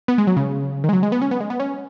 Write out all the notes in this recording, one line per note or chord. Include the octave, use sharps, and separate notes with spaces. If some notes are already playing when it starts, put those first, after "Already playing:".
B3
G#3
F#3
C#3
D#3
G#3
F#3
G#3
B3
C#4
B3
G#3
B3
C#4